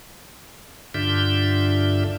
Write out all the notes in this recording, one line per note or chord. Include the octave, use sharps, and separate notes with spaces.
G2 D3 D4 F4 E5 G6